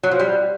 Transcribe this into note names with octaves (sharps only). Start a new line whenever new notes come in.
F#3
F3
G3